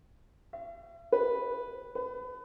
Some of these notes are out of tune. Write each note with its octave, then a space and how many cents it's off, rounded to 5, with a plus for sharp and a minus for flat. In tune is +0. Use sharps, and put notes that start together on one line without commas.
E5 +45
B4 -5
B4 +25